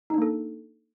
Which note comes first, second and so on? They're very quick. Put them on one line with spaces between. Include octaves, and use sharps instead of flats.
D#4 D4 A#3 A4